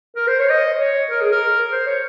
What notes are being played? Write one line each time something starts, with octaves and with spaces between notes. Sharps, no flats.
A#4
C5
C#5
D#5
C#5
A#4
G#4
A#4
C5
C#5